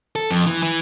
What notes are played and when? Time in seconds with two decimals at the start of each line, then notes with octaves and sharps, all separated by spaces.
0.16 A4
0.31 F2
0.47 E3
0.63 E3